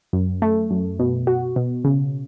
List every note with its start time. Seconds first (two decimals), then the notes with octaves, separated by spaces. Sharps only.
0.13 F#2
0.42 A3
0.71 F#2
0.99 B2
1.27 F#4
1.56 B2
1.84 C#3